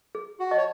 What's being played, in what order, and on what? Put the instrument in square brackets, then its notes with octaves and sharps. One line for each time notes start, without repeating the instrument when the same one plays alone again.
[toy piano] G#4
[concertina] F#4
[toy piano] D#5 A5 C#6
[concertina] C#5